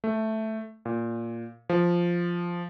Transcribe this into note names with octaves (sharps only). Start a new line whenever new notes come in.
A3
A#2
F3